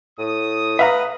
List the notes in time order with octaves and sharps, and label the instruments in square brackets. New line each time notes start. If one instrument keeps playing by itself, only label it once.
[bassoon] A2 [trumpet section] D#6
[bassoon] B4 [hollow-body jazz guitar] E5 F5 A#5